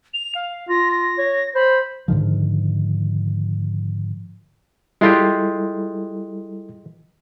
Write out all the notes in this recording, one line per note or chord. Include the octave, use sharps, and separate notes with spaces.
F7
F5
F4 A#6
A#6
C#5
C5 B5
G#2 D3 D#3 F3
G3 G#3 E4 F4 G4 A4